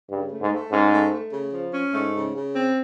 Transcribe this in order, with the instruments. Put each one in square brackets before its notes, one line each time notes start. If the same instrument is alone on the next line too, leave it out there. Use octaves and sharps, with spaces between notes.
[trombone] G2 [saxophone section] C#3
[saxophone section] A3
[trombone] G#2
[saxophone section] A3
[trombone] G#2 [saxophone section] C#4
[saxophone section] A3
A3
C#3
F3
C#4
[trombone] G#2 [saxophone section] A3
[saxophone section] C#3
C#3
C4